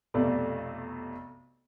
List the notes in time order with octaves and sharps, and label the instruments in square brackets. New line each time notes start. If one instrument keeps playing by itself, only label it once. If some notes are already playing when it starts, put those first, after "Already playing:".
[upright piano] B1 F2 C3 A3 D5